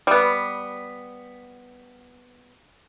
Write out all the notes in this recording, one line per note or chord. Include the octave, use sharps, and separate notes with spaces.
G3 B3